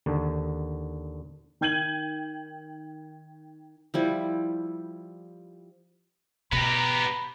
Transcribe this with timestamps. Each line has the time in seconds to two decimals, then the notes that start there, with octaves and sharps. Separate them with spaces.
0.06 D#2 D3
1.61 D#3 G5 G6 G#6 D#7 F#7
3.94 F3 G3 E4
6.52 B2 B3 G4 A#5 B5